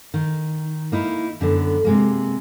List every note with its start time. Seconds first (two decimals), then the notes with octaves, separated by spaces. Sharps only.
0.14 D#3
0.92 A#3 D#4 E4
1.41 F#2 D3 B3
1.84 C3 G#3 A#3